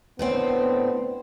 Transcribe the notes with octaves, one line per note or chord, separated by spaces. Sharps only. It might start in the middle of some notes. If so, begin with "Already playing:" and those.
A2 D3 B3 C4